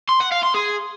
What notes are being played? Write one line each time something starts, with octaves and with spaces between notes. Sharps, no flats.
C6
F#5
F5
C6
G#4